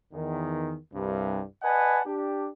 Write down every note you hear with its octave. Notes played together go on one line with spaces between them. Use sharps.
E2 D#3
C2 G2
B4 D5 D#5 F#5 G#5 A5
D4 G4